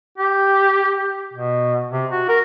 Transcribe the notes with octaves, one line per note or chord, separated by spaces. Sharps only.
G4
B2
C3
F#4
A#4